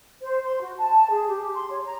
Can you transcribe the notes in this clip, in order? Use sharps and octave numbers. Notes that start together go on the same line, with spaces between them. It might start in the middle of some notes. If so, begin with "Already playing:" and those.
C5
C6
F#4
A5
G#4
G4
C6
C#5
A#5